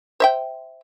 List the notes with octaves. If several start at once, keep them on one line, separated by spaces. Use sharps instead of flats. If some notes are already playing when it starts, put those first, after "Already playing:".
C5 E5 G5